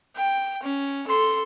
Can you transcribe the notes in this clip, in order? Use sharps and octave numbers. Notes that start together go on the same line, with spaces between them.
G5
C#4
A4 C6